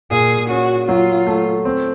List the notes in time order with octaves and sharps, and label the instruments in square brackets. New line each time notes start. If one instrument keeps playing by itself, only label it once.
[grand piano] A#2 [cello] G#4
[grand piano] C#4 [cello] F#4
[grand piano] F#3 [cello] F4
[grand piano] A3
C4